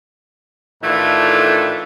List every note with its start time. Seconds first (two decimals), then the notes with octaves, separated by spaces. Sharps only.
0.83 A2 D#3 E3 A3 D4 F4